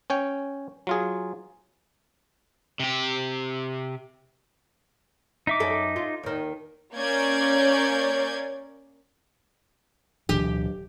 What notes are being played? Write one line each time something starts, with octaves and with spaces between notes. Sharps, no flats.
C#4 C#5 G5
F#3 F4 G#4
C3 G4
D#4 E5 D6
F#2 A4
F4
D#2 D#3
A#3 C#4 C#5 D5 G6 G#6
D1 D2 B2 E3 F#3 D4 G4